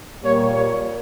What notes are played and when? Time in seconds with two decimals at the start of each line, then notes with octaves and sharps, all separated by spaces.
0.23 A#2 G3 A#3 C#5
0.53 C#5